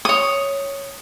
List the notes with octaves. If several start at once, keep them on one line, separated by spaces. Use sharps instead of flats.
C#5 D#6